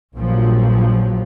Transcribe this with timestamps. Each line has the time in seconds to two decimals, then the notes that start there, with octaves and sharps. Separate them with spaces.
0.16 A#1 G2 F3 F#3